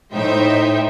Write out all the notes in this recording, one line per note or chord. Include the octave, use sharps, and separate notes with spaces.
A2 D#4 C5 E5 G5